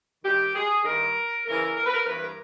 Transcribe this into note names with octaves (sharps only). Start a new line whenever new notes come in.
G2 D#3 G4
G#4
G2 D#3 A#4
E2 C#3 E3 A#4
A#4
B4
A#4
G2 E3 B4
A#4